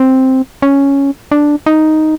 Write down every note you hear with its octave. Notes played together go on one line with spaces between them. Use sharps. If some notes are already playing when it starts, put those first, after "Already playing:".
Already playing: C4
C#4
D4
D#4